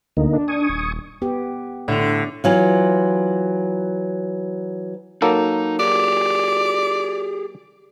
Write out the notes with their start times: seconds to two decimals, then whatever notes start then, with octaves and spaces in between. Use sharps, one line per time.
0.17 D2 D3 A#3 D#4
0.33 D4
0.48 G#5 C#6 D#6
0.70 D#1
1.22 B3 G4
1.88 A2 D3 F7
2.44 E3 F#3 F4
5.22 F#3 A#3 D#4 A4
5.80 G4 G#4 D5